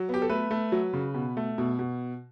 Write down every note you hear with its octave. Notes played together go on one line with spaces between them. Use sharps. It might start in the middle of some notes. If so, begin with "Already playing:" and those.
Already playing: F#3
B3 G4
A4
A3 B4
A3
F#3
C#3
B2
A3
B2
B2